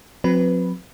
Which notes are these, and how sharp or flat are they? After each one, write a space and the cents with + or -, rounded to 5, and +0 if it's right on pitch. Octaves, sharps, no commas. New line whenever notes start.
F#3 -45 C4 +0 B4 +0